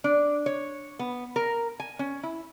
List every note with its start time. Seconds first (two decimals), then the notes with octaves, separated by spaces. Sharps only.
0.04 D4
0.46 C#5
0.99 B3
1.36 A#4
1.80 G#5
1.99 C#4
2.23 E4